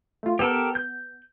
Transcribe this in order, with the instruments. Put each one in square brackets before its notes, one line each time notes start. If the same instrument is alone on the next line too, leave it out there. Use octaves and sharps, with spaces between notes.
[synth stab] A3 F4
[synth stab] B3 [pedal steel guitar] G4 A4 A#4
[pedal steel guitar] G6